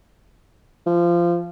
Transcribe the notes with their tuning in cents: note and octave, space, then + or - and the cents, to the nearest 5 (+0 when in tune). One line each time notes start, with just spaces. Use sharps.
F3 -20